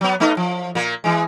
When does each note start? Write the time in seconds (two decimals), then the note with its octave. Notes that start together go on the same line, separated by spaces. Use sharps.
0.01 F#3 B3
0.20 A3 B3 D#4
0.37 F3
0.75 A#2 A#3
1.04 E3 G#3